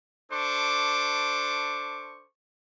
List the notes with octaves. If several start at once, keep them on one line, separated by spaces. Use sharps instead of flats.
D4 A4 C5 C#6 D6